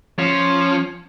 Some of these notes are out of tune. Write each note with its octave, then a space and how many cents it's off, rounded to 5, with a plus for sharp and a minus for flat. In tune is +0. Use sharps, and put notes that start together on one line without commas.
F3 +0 C#4 +0